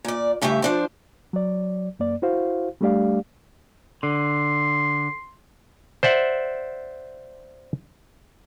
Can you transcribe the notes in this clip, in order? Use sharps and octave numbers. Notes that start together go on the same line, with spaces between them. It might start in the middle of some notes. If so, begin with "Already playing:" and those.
A#2 D5
G2 C#3 A3 G4 E5
F3 D4 C5
F#3 D5
F#2 A#3 D5
E4 F#4 C5 F5
G3 A3 D4 G4 D5 F5
D3 C6
C5 D5 E5 F#5